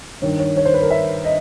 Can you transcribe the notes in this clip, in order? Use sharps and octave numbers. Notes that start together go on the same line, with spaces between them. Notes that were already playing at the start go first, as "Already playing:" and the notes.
G2 D#3 C#5
C#5
C#5
C5
B4
A#4
E5
D#5